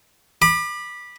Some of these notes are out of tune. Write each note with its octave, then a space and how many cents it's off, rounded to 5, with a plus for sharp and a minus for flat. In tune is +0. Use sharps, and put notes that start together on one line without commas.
B5 -15 D6 +35